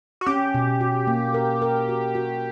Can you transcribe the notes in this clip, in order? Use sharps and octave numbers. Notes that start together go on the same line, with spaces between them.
F#4
C#4 G4
B2
F#4
A#3
A#4
A#4
F#4
F#4